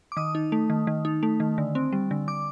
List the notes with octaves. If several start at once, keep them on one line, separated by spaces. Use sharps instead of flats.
D6
D#3 D#6
D#4
A3
D#3
D#3
D#4
A3
D#3
D3
C4
G3
D3
D3 D6